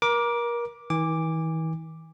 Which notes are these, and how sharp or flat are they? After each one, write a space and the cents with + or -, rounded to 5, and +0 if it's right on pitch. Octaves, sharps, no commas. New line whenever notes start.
A#4 +30 D6 +0
E3 -45 G#5 -25 D6 +0